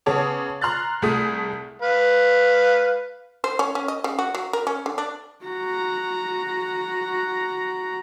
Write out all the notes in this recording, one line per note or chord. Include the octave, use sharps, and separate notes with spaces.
C#3 B3 G#4 C#5 A5 D6
A#5 C6 F6 F#6 A6
C2 A3 G#4 D#6
B4 F5 B5
C5
C#4
C#4
D#5
C#3
F#4
F#3
A#4
C#4
D3
D4
F#4 A#5